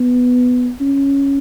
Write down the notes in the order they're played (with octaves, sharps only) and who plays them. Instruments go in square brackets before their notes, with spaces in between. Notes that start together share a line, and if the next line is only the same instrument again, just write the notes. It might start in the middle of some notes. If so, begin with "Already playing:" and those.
Already playing: [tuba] B3
C#4